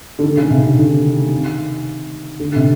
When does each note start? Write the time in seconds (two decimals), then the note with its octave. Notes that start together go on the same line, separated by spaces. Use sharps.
0.19 D3
0.23 D#3
0.37 C#3
0.50 C3
0.64 D3
0.78 D#3
2.40 D3
2.56 C3